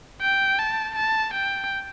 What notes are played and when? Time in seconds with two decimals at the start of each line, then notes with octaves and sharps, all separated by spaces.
0.22 G5
0.59 A5
0.96 A5
1.34 G5